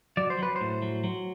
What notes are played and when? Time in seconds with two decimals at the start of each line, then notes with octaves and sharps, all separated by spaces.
0.17 F#3 D5
0.30 C5
0.39 F#3 B4
0.56 A2 C5
0.82 F#3
1.04 F#3